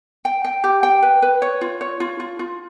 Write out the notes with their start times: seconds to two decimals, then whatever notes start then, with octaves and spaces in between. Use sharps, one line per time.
0.25 G5
0.44 G5
0.64 G4
0.83 G5
1.03 B4
1.22 B4
1.42 C#5
1.61 F4
1.81 C#5
2.00 F4
2.20 F4
2.39 F4